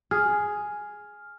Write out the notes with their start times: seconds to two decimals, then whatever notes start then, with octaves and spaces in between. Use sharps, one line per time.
0.11 G#4 F6